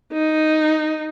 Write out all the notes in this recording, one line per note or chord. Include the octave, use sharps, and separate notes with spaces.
D#4